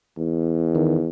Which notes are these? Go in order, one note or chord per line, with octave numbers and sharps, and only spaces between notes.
E2
D#3